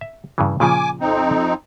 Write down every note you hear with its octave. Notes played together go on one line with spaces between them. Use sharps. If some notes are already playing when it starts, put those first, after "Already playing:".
E5
G2 C#3 E3
A#2 C#3 F3 G#5 D6
F2 C4 D#4